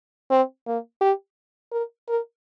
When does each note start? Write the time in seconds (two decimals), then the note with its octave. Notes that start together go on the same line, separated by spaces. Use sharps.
0.30 C4
0.67 A#3
1.01 G4
1.72 A#4
2.08 A#4